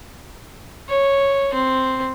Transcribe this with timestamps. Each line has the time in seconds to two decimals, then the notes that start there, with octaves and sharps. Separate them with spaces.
0.89 C#5
1.54 C4